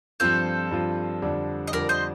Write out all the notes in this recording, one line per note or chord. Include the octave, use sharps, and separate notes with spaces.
G2 F3 C4 F4 A4 C5
G2 F3 C4 F4
F2 D3 G3 D4
D#5
F2 D3 G3 D4 A#4 D5
C5 D#5